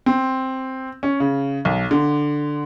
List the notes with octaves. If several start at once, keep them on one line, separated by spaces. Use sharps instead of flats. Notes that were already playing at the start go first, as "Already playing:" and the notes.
C4
C#4
C#3
B1
D3